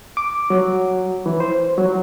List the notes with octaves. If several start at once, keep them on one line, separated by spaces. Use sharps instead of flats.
D6
F#3
E3
C5
F#3